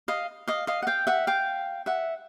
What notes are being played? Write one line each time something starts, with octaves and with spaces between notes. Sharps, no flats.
D#5 F5
D#5 F5
D#5 F5
F#5
F5 G5
E5 F#5
F5 G5
E5 F#5